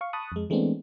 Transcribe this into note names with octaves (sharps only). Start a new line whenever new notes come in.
F5 C#6
A5 B5 C#6 D#6 F#6
F2 G#3
E3 G#3 A3 B3 C4 D4